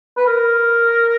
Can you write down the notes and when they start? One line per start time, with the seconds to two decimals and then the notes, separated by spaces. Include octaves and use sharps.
0.17 B4
0.27 A#4